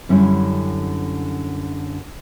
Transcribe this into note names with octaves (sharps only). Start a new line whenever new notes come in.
F#2 D3 G3 C#4 E4